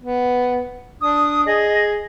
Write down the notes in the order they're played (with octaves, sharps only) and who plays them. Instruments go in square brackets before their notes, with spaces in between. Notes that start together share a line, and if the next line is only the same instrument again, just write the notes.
[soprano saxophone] B3
[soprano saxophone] D4 [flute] D#6
[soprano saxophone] G#4 [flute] D#5